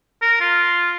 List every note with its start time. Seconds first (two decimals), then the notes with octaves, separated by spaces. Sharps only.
0.22 A#4
0.41 F4